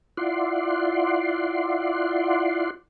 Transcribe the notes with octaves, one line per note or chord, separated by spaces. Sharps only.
E4 F4 D5 F#5 C6